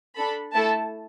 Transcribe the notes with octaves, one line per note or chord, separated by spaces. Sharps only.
D4 A4 B5
A3 E4 A4 A5